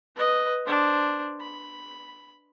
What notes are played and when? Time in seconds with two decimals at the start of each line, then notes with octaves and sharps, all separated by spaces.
0.16 B4 D#5
0.66 D4 C5
1.41 B5